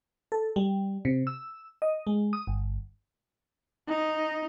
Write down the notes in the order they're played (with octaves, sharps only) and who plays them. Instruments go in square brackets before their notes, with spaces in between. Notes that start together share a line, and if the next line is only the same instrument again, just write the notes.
[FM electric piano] A4
G3
C3
E6
D#5
G#3
D#6
G1
[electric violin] D#4